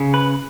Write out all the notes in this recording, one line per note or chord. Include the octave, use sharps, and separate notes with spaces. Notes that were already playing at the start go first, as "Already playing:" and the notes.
Already playing: C#3
B4